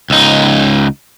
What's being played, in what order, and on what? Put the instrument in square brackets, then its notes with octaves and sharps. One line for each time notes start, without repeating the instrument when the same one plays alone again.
[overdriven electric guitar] C#2 D#4